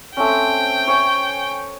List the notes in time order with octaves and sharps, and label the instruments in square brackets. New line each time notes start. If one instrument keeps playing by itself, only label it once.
[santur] A3 C4 C#4 [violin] G5
[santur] C#5 G#5